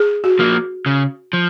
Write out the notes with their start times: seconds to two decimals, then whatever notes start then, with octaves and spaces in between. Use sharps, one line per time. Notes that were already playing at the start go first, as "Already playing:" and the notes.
Already playing: G#4
0.24 F#4
0.39 F3 A#3
0.86 C#3
1.33 F3